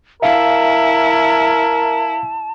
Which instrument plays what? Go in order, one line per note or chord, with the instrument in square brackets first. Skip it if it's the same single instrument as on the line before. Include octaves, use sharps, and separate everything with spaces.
[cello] E4 [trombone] A#4 [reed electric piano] E5 F5 [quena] A5